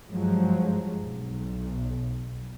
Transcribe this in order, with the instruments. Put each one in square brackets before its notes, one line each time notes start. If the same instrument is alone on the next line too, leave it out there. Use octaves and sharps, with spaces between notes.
[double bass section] G2 F3 F#3 G#3
B1